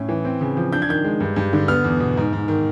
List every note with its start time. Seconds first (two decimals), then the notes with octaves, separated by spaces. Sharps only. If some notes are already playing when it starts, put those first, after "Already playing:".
Already playing: A2 C#4
0.09 E3
0.25 C4
0.41 C#3
0.57 F3
0.73 D4 G6
0.82 G#6
0.89 D#3 G6
1.04 G#3
1.20 G2
1.36 G2
1.53 D3
1.68 B3 F6
1.84 E2
2.00 B2
2.17 G#2
2.33 G#2
2.48 D#3